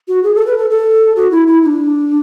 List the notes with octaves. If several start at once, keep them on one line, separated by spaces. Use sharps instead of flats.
F#4
G#4
A4
B4
A4
A4
F#4
E4
E4
E4
D4